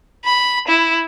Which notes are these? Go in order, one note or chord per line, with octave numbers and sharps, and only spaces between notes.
B5
E4